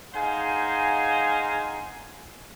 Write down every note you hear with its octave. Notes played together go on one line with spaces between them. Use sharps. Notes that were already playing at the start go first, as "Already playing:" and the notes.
D#4 G#4 C5 F5 F#5 G#5